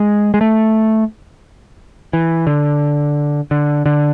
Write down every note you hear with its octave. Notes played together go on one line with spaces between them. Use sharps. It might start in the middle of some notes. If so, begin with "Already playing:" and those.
Already playing: G#3
G#3
A3
E3
D3
D3
D3